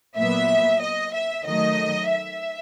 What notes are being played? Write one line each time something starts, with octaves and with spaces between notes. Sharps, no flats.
A#2 F#3 B3 E5
D#5
E5
D#3 F#3 A3 D#5
E5